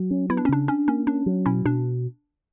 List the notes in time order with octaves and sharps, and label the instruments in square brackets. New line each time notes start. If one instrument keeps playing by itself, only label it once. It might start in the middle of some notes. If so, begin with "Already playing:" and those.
Already playing: [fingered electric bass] F#3
C#4
[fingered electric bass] B3 [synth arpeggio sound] E4
[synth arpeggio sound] D4
C#4
[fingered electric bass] C#3 [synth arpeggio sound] D4
[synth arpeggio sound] C#4 [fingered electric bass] D4
[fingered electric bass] A#3 [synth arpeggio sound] C#4
[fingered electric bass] C#4 [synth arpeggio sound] D4
[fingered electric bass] F#3
[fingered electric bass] B2 [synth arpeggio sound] C#4 E4
[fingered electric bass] B2 [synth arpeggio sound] D4